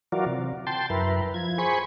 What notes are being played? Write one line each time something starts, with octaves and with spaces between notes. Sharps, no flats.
E3 F#3 F4 F#4 A#4 D5
C3
G5 A5 C6
F#2 E4 A#4 B4
F3 G#6
G#4 C5 G#5 B5 C#6